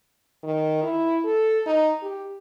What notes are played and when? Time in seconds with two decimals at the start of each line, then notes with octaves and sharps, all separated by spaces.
0.43 D#3
0.83 E4
1.25 A4
1.66 D#4
2.02 G4